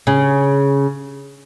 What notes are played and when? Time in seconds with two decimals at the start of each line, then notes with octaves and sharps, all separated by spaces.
0.07 C#3